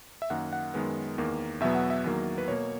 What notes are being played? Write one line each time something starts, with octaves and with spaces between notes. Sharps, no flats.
E5
F#2 D#3 A#3 F#5
F#5
F#2 D#3 G#3 B3
E2 D#3 A#3
E2 B2 F#3 B3 E5
F#5
E5
E2 D#3 F#3 A#3
B4
B2 A#3 C#5